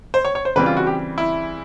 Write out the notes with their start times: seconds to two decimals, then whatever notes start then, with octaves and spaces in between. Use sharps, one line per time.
0.14 C5
0.25 C#5
0.35 C#5
0.45 C5
0.56 C#3 E3 G3 C4 B4
0.66 F4
0.77 F#4
0.87 G4
1.18 E4